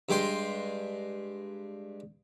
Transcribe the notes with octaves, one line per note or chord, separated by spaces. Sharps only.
G2 G#3 G5 C6